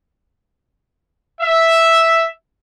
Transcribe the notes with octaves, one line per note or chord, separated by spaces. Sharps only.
E5